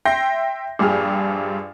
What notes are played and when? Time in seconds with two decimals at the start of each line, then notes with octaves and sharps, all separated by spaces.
0.05 E5 G5 C6 G6 A#6 C7
0.79 A#1 G2 G4 G#4 F6